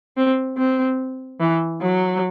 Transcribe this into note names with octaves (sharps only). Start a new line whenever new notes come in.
C4
C4
E3
F#3